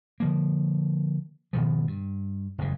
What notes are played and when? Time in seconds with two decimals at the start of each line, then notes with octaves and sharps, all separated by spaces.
0.20 D3 F3 A#3
1.53 G#1 B2 D#3 F3
1.87 G2
2.58 F#1 E2 G#2 C#3